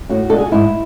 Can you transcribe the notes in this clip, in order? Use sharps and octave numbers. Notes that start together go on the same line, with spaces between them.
A2 F#4
G#3 D4 A4
G#4
F#4
G#2 E4